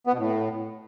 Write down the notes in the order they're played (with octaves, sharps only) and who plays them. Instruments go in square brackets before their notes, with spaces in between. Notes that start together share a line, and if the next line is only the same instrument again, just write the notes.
[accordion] B3
B2
A2